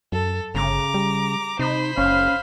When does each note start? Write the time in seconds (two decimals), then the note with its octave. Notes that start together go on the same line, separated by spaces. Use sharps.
0.12 F#2 A4
0.55 G1 C#3 A#5 D6
0.94 G3
1.59 C3 D#4 C5 B5
1.98 F#1 C#4 F5